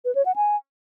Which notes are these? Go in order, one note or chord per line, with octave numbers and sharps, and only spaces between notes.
B4
C#5
F#5
G#5